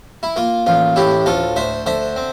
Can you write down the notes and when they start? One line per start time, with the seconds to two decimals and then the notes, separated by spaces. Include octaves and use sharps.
0.23 E4
0.36 A#3 F4
0.66 A1 F4
0.96 A2 E4 G4
1.26 D2 F4 A4
1.56 D2 C5 E5
1.86 D3 C5 E5
2.16 C4